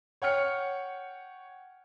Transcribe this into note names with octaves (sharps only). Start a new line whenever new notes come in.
C#5 F#5 G5 F6 C#7